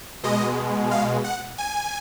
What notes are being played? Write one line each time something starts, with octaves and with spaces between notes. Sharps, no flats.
B2 G#3 D#5
F5
F#5
G#5